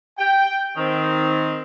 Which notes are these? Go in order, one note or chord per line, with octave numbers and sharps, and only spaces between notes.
G5
D#3 C4